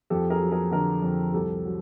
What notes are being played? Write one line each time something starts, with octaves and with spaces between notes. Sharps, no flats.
F2 G4 A4
G#4 A#4
F#3
G#4 A#4
D3 G#4 A#4
F2
C2 G4 A4
F#3